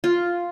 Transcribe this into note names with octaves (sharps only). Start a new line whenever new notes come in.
F4